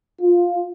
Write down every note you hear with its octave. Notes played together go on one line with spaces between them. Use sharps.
F4